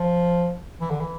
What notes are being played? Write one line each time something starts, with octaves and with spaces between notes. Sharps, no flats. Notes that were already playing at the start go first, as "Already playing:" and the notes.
Already playing: F3
E3
D3
E3